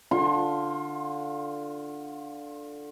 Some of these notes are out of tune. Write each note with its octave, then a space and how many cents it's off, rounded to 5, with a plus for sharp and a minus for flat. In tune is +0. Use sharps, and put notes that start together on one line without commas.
D3 +0 F4 +0 C6 +35